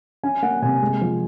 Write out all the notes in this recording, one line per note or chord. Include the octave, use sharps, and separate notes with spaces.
C#4 G#5
A#3 F#5
C3 G#5
G#3
F3